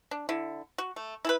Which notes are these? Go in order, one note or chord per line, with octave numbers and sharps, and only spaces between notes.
D4
D3 E4
F#4
A3
E4 A4 B4